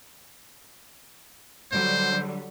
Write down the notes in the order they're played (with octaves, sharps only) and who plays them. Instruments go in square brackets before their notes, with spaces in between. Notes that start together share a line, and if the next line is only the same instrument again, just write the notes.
[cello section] D3 F#3 G3 [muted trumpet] C5